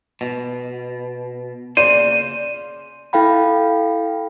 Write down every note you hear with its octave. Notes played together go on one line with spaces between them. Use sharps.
B2
C#3 A#3 C5 D5 D#7
E4 A4 F5 G5 B5